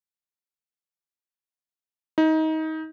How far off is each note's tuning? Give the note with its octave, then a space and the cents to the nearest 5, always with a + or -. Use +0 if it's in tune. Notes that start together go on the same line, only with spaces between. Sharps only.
D#4 +25